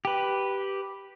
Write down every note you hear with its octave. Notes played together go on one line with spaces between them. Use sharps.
G4 B4